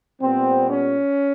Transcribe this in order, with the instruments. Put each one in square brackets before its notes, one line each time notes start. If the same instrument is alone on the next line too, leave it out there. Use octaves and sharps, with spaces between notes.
[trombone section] A#2 G3 B3 C4
C#4